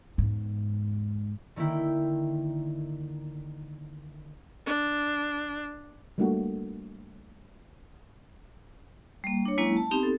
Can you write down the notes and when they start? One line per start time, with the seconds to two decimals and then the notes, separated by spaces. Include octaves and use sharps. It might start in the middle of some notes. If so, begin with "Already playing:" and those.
0.18 E2 G#2
1.56 D3 D#3 A#3 E4 G5
4.66 D4
6.18 G3 A3 A#3 D4 F#4
9.24 G3 A#3
9.45 D4 C#5
9.58 F#3 G#3 A#3 C#4 E4
9.77 A5
9.91 B3 C4 D#4 G4
10.03 A4